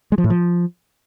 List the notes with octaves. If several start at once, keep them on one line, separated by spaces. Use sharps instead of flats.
G#3
F3
A2
F3